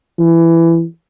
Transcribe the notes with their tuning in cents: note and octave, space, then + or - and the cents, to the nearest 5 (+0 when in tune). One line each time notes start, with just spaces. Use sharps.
E3 +15